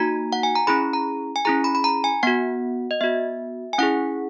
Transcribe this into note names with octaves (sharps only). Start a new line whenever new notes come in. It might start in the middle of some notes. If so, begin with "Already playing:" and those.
Already playing: A#3 D#4 F#4 A#5
F#5
G#5
A#5
C#4 E4 G#4 B5
A#5
G#5
C#4 E4 G#4 A#5
B5
B5
A#5
G#5
B3 F#4 F#5
D#5
B3 F#4 E5
G#5
C#4 E4 G#4 F#5